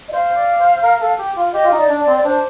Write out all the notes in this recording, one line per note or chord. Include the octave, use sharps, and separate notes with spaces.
D#5
C5 F5
D5
C5
A#4
A4
G4
F4
G4 D#5
F4
D#4 D#5
D5
D4
D5
C4
D5
D4 C5